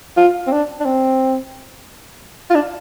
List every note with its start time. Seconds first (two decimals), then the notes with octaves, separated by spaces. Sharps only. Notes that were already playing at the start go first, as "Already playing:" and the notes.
0.17 F4
0.47 C4
0.52 D4
0.80 D4
0.85 C4
2.50 F4
2.55 D4